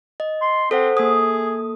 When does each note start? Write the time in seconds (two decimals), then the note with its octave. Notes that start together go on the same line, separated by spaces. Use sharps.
0.20 D#5
0.41 C6
0.71 C4 A4 C5 F#5
0.97 A#3 G#4 A4 D#6